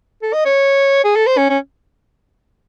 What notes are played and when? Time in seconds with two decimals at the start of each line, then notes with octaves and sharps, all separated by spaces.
0.23 A4
0.33 D#5
0.45 C#5
1.04 G#4
1.16 A4
1.27 C5
1.38 C#4
1.50 C#4